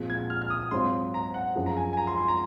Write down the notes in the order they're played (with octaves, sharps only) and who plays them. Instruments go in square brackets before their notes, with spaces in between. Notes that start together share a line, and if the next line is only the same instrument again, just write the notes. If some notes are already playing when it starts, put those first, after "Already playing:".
Already playing: [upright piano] A#2 F3 G#3 C4
[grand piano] G#6
F6
F6
D#6
[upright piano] G#2 F#3 C4 F4 [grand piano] C6
[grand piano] A#5
F#5
[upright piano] F#2 F3 G#3
[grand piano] A#5
G#5
G#5
A#5
C6
C6
A#5